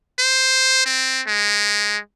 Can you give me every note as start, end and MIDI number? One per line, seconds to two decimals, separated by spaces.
0.19 0.83 72
0.85 1.22 60
1.27 1.97 56